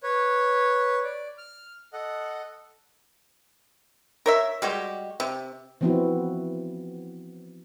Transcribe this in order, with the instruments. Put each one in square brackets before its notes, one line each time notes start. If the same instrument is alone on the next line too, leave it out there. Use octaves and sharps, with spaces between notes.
[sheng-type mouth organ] B4 C#5
D5
F6
A4 D#5 F#5
[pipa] A#4 C#5 E5
G3 G#3 F#4 G4
C3
[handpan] E3 F3 B3 C4 E4 F#4